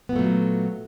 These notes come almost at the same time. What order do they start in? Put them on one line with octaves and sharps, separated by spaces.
B3 A#2 A3 F#3